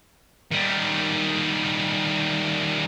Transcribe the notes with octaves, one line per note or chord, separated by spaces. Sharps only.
D#3 G3